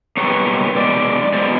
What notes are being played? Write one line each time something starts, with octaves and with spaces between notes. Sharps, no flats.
B2 G3 A#3 B4 C#5
B2 G#3 D5
B2 G#3 B3 C5 D5